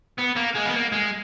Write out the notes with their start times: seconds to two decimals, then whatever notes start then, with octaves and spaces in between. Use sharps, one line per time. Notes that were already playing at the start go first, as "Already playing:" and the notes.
0.19 B3
0.36 A#3
0.55 G#3
0.66 B3
0.74 A#3
0.92 G#3